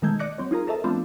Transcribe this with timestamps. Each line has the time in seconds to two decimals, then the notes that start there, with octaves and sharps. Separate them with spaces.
0.02 B2 D#3 G#3 A3 G6 G#6
0.19 D5 D#5 D6 F#6 A#6 C#7
0.38 F#3 C4 C#5
0.51 D#4 F4 G#4 A#4 A#5
0.67 A4 A#4 C5 D#5 E5 A5
0.84 F3 A3 B3 C4 D4 F4